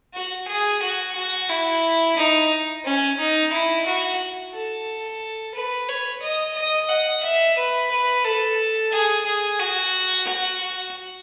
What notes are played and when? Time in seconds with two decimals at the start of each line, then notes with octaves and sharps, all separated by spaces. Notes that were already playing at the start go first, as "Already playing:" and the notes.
0.15 F#4
0.48 G#4
0.82 F#4
1.16 F#4
1.50 E4
2.17 D#4
2.85 C#4
3.19 D#4
3.52 E4
3.86 F#4
4.53 A4
5.55 B4
5.88 C#5
6.22 D#5
6.56 D#5
6.89 F#5
7.23 E5
7.57 B4
7.91 B4
8.24 A4
8.92 G#4
9.26 G#4
9.60 F#4
10.27 F#4
10.61 F#4